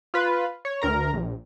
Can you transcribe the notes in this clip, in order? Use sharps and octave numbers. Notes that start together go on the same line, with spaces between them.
F4 B4
C#5
D2 A#4 A#5
A#1